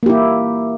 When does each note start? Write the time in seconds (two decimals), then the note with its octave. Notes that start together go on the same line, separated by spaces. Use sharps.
0.03 A#3
0.06 G4
0.10 E4